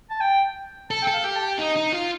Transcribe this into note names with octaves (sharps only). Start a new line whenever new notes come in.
A5
G5
A4 A5
G5
A4
F5
G4 G5
A5
G5
D#4 D#5
D#4
F4